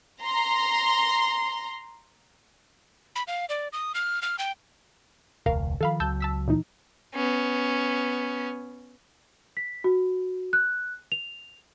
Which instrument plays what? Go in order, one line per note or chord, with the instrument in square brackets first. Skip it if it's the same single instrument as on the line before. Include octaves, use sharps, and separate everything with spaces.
[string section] A#5 C6
[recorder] B5
F5
D5
D#6
F6
F6
G5
[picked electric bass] E1 C#2 [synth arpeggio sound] A#4 F5
[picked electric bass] D#3 F3 [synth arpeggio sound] A4 F5 B5
[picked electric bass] C#2 F#3 [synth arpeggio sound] A5 E6 G6
[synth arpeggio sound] A5 E6 B6
A#2 E3 D#4
[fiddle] B3 C#4
[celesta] B6
F#4
F#6
F7